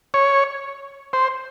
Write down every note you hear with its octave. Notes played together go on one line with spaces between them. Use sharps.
C#5
C5